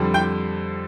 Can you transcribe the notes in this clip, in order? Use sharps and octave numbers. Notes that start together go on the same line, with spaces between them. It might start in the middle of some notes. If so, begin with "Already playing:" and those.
Already playing: F2 D3 G3
G5 G6